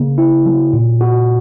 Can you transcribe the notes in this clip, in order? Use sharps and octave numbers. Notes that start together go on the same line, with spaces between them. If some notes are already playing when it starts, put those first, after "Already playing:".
Already playing: C#3 A#3
E4
F#3
A#2
F#4